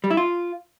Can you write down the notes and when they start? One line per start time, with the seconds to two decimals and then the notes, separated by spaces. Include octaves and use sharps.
0.04 G3
0.10 E4
0.17 F4